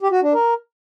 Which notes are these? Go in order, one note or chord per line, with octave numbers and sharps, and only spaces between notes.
G4
F#4
D4
A#4